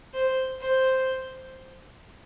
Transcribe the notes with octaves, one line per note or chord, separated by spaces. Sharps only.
C5
C5